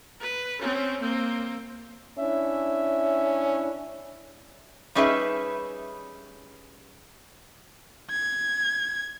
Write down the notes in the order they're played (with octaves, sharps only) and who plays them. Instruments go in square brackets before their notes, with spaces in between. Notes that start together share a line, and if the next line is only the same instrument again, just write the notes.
[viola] B4
C4 C#4
A#3 C4
[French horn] C#4 [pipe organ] D4 E4 [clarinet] E5
[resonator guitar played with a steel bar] G3 C#4 D#4 G#4 B4 E5
[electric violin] G#6